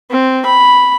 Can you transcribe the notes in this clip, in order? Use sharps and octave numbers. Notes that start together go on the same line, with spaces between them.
C4
B5